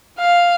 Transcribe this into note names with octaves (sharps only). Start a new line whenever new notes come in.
F5